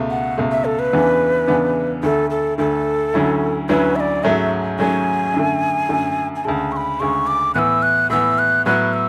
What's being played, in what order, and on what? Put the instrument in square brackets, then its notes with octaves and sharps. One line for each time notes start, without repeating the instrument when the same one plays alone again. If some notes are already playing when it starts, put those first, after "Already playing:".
Already playing: [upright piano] C#2 B2 A3
[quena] F#5
[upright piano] C#2 B2 A3
[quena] E5
A4
B4
[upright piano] E2 C#3 E3 B3 D4
E2 C#3 E3 B3 D4
[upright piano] D2 D3 A3 [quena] A4
[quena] A4
[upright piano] D2 D3 A3 [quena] A4
[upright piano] D2 D3 F#3 C#4 E4
[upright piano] D2 D3 F#3 C#4 E4 [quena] B4
[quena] E5
D5
[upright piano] G#2 F#3 A3 C#4 [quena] E5
[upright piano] G#2 F#3 A3 C#4 [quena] G#5
[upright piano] F#2 D3 A3
F#2 D3 A3
[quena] G#5
[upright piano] D2 C#3 G#3 [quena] A5
[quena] C#6
B5
[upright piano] D2 C#3 G#3 [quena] C#6
[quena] D6
[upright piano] A2 E3 B3 [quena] E6 F#6
[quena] F#6
[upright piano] A2 E3 B3 [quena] E6
[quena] F#6
[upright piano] A2 F#3 B3 [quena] F#6
[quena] E6